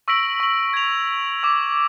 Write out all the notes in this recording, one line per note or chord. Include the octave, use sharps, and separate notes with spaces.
C#6 E6 A#6 B6 D7 F#7
C#6 F#7
G#6 F7
D6 E6